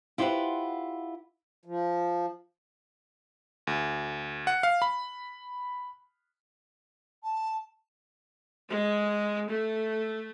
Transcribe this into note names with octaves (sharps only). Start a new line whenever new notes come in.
E4 F4 G4 B4 C5 F#5
F3
D2
F#5
F5
B5
A5
G#3
A3